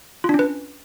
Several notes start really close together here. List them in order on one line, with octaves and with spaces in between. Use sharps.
F4 D4 C#4 B4